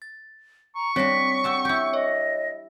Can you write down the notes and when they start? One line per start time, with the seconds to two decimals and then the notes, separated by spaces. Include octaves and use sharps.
0.02 A6
0.76 A#5 C#6
0.96 G3 C4 D4 C#5 A#6 B6
1.44 G4 F#5 A5 E6
1.65 E4 G4 G6
1.94 C#5 D#5